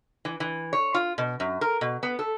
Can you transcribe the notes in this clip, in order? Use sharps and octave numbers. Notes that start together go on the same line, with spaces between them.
E3
E3
C#5
F4
B2
F#2
A#4
B2
B3
A4